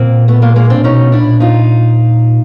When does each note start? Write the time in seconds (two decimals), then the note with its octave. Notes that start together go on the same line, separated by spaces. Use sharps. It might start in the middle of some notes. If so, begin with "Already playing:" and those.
Already playing: A#2 A#3 C4
0.28 A3 B3
0.42 G#3 A#3
0.56 G#3 A#3
0.70 C4 D4
0.84 B2 C#4 D#4
1.12 A#2 D4 E4
1.40 D#4 F4